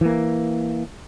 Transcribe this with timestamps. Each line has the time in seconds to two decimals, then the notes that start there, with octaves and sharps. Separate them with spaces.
0.01 E3 A#3